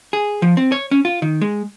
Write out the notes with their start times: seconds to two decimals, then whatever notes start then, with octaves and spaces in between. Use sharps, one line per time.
0.13 G#4
0.42 F3
0.57 C4
0.72 C#5
0.91 C#4
1.05 F4
1.22 D#3
1.41 G#3